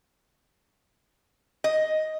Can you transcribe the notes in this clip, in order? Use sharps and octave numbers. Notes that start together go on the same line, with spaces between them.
D#5